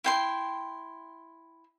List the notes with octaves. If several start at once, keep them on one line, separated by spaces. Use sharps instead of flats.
E4 G5 C6